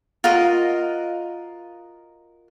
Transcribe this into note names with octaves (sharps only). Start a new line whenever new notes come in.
F4 F#4 A#4 D#5